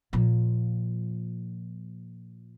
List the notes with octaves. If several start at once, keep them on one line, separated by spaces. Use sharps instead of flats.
A#2 F3